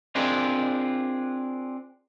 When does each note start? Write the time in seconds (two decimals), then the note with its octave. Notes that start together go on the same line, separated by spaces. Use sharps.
0.15 C4 D4 F4 G#4 A#4